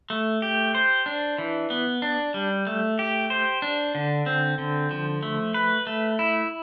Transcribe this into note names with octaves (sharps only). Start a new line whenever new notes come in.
A3
G4
C5
D4
E3
B3
D4
G3
A3
G4
C5
D4
D3
C4
D3
F3
A3
B4
A3
E4